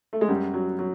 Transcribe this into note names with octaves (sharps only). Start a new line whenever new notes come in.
A3
G#3
F#2 G3
F#3
F#3